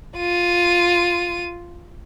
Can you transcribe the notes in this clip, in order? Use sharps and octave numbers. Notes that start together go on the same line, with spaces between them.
F4 D#7